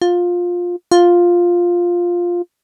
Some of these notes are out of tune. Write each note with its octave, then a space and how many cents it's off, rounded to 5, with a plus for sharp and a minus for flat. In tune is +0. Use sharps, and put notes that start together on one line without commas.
F4 +15
F4 +5